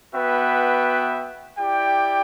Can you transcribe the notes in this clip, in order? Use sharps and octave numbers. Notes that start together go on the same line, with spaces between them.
B3 F#4 B4 E5 G5
E4 G4 D5 G5